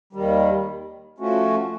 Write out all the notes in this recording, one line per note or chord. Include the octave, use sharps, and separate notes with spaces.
D#2 D#3 G3
F3 A3 C#4 F#4